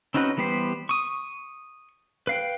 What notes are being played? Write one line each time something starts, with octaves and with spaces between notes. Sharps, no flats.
C4 C#4 D#4 F#4 B4
E3 G3 B3 G4 C5
C#6 D#6
B4 F5 G5